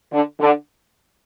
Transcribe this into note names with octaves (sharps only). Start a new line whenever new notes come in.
D3
D3